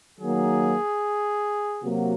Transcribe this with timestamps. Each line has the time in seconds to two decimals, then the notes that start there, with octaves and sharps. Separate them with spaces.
0.20 D#3 F#3 A#3 G#4
1.82 C3 F#3 A#3 F#4